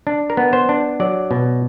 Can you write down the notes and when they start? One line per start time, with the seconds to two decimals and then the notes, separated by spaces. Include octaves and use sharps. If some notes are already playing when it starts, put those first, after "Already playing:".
0.07 D4
0.30 A#4
0.37 B3
0.53 C5
0.69 D4
1.00 F#3 D5
1.31 B2